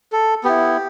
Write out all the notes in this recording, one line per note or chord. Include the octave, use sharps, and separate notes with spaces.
A4
B3 E4 G4